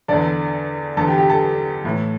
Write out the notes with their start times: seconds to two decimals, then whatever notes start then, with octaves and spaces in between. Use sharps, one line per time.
0.08 E2 D3 A4 D5
0.97 E2 D3 A4
1.08 G4
1.18 G4
1.29 A4
1.84 A2 E3